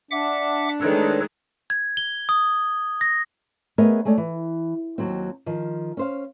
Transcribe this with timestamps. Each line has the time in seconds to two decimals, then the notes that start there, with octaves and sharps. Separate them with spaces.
0.11 D4 E5 F#5 D6
0.82 D#3 G#3 A3 A4 B4 C#5
1.70 G#6
1.97 G7
2.29 D#6
3.01 A#6
3.78 A3 B3 G#4 A#4 C#5 D#5
4.05 G#3 A3 A4 C#5 D5
4.18 E3
4.98 D#2 F#3 C4
5.46 D#3 F3
5.97 C#4 C5 F5